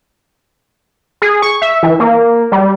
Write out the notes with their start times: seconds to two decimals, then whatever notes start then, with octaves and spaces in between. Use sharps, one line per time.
1.22 G#4
1.42 C#6
1.62 E5
1.83 E3
2.00 A#3
2.52 G3